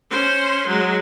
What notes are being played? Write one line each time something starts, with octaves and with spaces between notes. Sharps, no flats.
C#4 C5
F#3 G#3